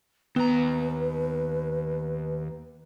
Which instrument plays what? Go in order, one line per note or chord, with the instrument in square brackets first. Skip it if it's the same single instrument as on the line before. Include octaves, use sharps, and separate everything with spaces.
[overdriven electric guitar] D#2 A#5 [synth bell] B3 [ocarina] B4